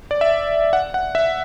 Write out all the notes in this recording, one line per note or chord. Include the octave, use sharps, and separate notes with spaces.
D5
E5
F#5
F#5
E5